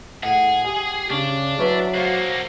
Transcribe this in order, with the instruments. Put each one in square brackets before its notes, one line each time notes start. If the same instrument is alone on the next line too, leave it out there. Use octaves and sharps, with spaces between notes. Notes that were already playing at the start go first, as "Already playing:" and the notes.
[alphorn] A2 [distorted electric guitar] G#4 [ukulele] F#5
[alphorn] G4 [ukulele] G#5
[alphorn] C#3 [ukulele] C#4 [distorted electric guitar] D4
[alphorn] F#3 [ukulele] C#4 E4 B4
[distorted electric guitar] A#3 F#4 [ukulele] C5 F5